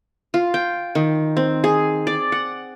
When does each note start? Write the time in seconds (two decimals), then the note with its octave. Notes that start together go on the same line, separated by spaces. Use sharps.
0.34 F4
0.54 G5
0.95 D#3
1.37 C4
1.64 G#4
2.07 D5
2.32 F#5